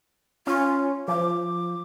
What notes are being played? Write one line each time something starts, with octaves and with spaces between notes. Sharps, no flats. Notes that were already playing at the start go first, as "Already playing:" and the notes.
C#4 F4
F3 D6